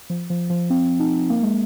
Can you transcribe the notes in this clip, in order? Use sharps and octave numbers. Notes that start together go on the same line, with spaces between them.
F3
F3
F3
C4
D#4
A#3
G#3